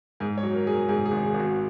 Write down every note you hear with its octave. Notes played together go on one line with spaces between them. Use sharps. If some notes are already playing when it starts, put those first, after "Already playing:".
G#2 G#4
C#5
F#3
A#4
F#3 G#4
A#4
G#2 G#4
G#4
G#1
G#4
G#1
F#4